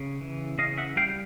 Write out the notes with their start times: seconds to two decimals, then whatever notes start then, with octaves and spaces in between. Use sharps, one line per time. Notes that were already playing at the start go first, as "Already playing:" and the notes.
Already playing: C#3
0.21 E3
0.58 C#3 D#5 F5
0.78 E5 F#5
0.96 G3 F5 G5